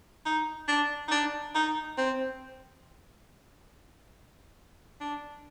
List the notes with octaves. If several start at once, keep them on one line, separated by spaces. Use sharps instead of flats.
D#4
D4
D#4
D4
D#4
C4
D4